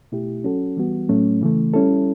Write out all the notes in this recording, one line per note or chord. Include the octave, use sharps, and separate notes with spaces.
B2 A3 E4 G4
F#3 C#4 F#4 A4
E3 G3 B3 F#4
A2 F#3 A3 C#4
C#3 E3 A3
G3 C#4 E4 A4